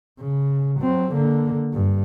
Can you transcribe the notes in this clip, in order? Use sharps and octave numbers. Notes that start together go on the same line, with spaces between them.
C#3
F#3 C4
D3 A#3
G2